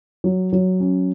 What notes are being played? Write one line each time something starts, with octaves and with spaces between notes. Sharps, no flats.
F#3
F#3
C#4